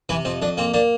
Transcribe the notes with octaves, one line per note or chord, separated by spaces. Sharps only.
C3 E3 E4
F2 C4
F2 D4
A#3 C4
A#3 D4